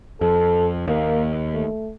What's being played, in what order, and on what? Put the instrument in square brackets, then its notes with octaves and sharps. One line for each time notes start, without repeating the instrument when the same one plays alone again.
[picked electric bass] F2 [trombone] A4
[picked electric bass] D#2 [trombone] A#3
[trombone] A3